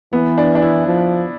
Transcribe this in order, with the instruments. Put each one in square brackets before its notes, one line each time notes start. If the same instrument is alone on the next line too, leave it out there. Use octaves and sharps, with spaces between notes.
[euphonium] E3 [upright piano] B3
[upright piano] D4
D4
E4
[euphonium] F3